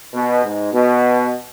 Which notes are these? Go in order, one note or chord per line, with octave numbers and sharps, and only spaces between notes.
B2
G#2
B2